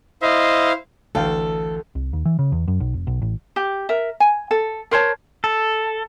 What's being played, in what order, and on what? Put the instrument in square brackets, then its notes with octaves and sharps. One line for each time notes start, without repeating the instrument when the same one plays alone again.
[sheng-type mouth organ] E4 C5 F5 [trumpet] D#5
[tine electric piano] A1 E3 [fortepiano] D2 F5 G5 [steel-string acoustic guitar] A4
[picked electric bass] C2
D#2
E3
C#3
E2
F#2
B1
F1
B1
A1
[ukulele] G4
A#4 E5
G#5
A4
A#4 C5 C#5 A5
[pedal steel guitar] A4